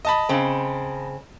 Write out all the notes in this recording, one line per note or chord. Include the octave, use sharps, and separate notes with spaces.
D#5 A5 B5
C#3 C4